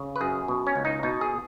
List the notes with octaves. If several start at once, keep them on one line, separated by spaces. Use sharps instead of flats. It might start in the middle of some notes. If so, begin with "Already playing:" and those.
Already playing: C#3
B4
F#2 G#4
B2
C#4
C#2
D#4
B2 D#4
G#4